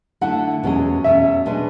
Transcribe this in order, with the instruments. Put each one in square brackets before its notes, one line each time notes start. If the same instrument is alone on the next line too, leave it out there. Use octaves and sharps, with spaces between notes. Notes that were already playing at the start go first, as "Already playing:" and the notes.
[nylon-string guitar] D3 A3 E4 A4 [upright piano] F#5
[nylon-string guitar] E2 B2 G#3 C#4 G#4
[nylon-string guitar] E2 B2 G#3 C#4 G#4 [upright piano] E5
[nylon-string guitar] B2 G#3 D4 G#4 B4